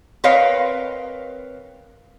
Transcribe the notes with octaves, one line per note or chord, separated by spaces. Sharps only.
C4 A#4 B4 C#5 D#5 F5